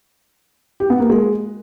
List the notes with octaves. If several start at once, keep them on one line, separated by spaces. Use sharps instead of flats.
G4
B3
A#3
G#3